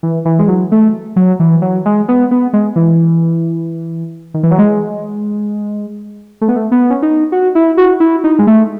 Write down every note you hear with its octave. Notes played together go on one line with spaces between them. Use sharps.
E3
E3
G#3
F#3
A3
F#3
E3
F#3
G#3
B3
B3
G#3
E3
D#3
E3
F#3
G#3
A3
B3
A3
B3
C#4
D#4
F#4
E4
F#4
E4
D#4
G#3
A3